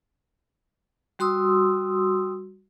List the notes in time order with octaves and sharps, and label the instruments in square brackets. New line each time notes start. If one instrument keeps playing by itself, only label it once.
[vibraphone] G3 F#4 C6 D#6 E6